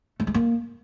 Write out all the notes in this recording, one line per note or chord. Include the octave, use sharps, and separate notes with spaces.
A3
G#3
A#3